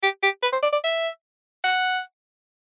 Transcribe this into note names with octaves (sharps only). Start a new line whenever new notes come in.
G4
G4
B4
C5
D5
D5
E5
F#5